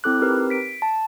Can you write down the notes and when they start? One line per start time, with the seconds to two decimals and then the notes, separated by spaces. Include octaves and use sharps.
0.04 C4 E4 A4 D6 F#6
0.20 C4 D#4 G4 A#4 B4
0.50 B6 D7
0.82 A5